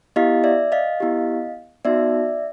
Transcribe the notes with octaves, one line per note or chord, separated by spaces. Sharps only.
B3 E4 G4 D#5 F5
D5 E5
D#5 F5
B3 E4 G4
B3 D#4 F#4 D5 E5